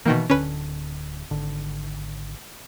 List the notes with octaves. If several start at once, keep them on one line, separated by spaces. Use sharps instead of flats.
B2 D#3 E3 A#3
D1 D3 C#4 B4
G#1 D3